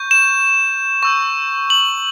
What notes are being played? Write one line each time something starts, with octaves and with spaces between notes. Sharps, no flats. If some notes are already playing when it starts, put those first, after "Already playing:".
Already playing: C#6 G6
E7
C#6 E6 G6
F#7